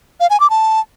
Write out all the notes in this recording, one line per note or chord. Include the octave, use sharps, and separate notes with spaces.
F5
G#5
D6
A5